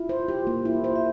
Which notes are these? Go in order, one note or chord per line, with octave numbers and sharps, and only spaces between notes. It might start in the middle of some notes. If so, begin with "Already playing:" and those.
Already playing: E4 F4
C5
G4
A#3
E4
C5
E5